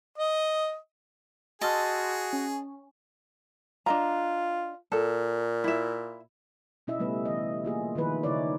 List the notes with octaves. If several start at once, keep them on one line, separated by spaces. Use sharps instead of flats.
D#5
F#4 G#4 D#5 A5 C6 E6 F6
C#4
D4 F4 D#5 A#5
A#2 A4
E4 E5
B2 C#4 E4 D#5 E5
C#3 G3 A3 B3 B4
E3 D#5
A#3 F4 G#4
D#3 F3 E4 B4
C#3 D#4 E4 B4 C#5 D5